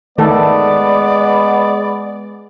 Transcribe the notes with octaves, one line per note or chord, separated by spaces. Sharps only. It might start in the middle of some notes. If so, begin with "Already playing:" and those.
D#3 G#3 A3 B3 A4 D5